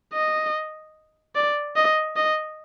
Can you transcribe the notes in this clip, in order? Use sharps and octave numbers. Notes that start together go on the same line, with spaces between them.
D#5
D5
D#5
D#5